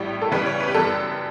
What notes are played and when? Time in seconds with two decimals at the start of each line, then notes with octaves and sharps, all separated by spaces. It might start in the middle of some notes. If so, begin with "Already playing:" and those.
Already playing: A1 A2 G3
0.22 A4
0.31 C#2 C#3 E3 G3 B4
0.46 C#5
0.60 B4
0.68 G4
0.74 F#2 E3 G3 A4